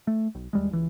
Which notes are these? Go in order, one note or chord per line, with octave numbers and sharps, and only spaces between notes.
A3
B1
D#2 G3 G#3
C#2 E3